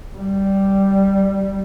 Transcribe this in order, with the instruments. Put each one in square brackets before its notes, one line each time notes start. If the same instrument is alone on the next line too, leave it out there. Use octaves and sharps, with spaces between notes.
[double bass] G3